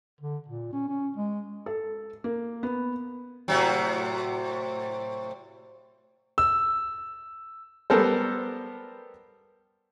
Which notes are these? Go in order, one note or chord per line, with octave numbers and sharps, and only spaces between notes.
D3
A#2
C#4
C#4
G#3
A4
A#3
B3
A2 C3 F#3
E6
G3 B3 A4 A#4 C5